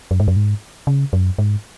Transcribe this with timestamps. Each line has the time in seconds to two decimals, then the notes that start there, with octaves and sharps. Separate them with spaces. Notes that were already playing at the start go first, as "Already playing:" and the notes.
0.11 F#2
0.20 G#2
0.28 F#2
0.36 G#2
0.87 C#3
1.13 F#2
1.38 G#2